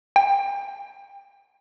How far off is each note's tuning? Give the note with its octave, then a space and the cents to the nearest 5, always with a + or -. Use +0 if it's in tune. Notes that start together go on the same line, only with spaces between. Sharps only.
G5 +25